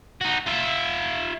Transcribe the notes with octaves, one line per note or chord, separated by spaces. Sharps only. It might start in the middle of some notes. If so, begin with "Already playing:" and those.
D#4 F#4
F4 E5